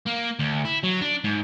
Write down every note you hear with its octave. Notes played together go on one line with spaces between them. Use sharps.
A#3
D2
E4
F#3
D4
G#2